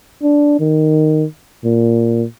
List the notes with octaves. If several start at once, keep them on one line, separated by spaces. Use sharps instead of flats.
D4
D#3
A#2